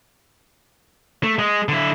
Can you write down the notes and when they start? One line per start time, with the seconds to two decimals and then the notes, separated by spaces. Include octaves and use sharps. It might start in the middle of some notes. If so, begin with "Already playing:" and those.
1.24 A3
1.39 G#3
1.69 D3 E4